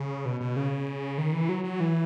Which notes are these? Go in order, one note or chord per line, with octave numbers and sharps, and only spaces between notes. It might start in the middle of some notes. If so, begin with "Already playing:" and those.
Already playing: C#3
B2
B2
C#3
D#3
E3
F#3
F#3
E3